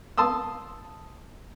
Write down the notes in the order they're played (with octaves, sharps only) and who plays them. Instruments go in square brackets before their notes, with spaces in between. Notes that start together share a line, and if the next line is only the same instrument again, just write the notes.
[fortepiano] A5 C6 D#6 E6